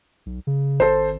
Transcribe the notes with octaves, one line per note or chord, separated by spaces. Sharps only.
B1
C#3
G#1 A4 C5